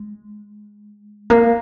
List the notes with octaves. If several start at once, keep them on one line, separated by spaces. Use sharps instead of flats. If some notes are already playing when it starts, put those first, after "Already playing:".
Already playing: G#3
A#3